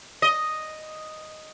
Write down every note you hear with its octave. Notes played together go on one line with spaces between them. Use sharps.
D#5